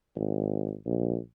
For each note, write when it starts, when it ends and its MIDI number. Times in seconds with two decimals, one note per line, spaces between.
0.16 0.74 32
0.86 1.18 34